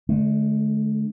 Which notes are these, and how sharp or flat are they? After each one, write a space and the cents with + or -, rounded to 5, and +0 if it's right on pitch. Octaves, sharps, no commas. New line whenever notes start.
D3 +0 A3 -45